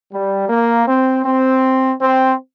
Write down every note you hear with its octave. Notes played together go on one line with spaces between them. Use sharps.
G3
A#3
C4
C4
C4